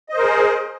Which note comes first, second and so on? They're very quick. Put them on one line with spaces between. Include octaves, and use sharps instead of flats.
D#5 C5 A#4 G#4